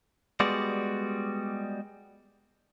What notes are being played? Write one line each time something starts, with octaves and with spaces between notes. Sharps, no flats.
G3 G#3 B3 F#4 D5